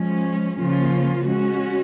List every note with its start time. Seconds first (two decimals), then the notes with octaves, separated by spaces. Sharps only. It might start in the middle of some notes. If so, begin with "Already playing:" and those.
Already playing: F3 G#3 C#4
0.57 C#3 F3 A#3 C#4 F4
1.28 G#3 C#4 F#4